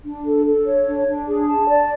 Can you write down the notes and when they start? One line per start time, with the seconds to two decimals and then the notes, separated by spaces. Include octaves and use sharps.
0.04 D4
0.25 A4
0.46 A4
0.66 C#5
0.86 D4
1.06 D4
1.27 G#4
1.47 A5
1.68 D5